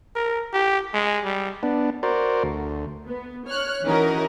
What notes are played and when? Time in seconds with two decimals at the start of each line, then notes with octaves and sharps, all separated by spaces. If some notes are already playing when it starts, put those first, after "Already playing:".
0.16 A#4
0.53 G4
0.93 G#3
1.24 G3
1.63 B3 D4
2.03 F#4 A#4 C5 D5
2.43 D2
3.07 B3
3.47 C#5 F6 F#6
3.86 E3 C#4 D#4 F#4 A#4 G#5